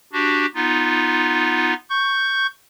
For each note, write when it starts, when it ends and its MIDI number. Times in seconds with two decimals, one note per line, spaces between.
0.13 0.46 62
0.13 0.46 66
0.13 0.46 67
0.55 1.74 59
0.55 1.74 63
0.55 1.74 65
1.90 2.47 85
1.90 2.47 91